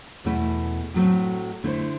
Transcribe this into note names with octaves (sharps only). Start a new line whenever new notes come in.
E2 B2 A3 E4
A2 F#3 A3 C4
D3 A3 E4 A4 C5